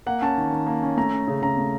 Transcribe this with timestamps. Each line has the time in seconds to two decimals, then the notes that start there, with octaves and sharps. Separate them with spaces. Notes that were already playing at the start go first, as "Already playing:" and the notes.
0.06 A#3 F#5
0.22 C#4 A5
0.37 D#3
0.52 D#3
0.67 A#3
0.83 C#4
0.97 A3 A#5
1.13 C#4
1.28 C#3
1.42 C#3 A#5
1.57 A3